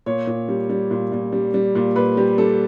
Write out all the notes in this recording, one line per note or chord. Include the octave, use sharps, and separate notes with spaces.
A#2 C#5
A#2
G3
G3
A#2
A#2
G3
G3
A#2
A#2 B4
G3 G4
G3 A4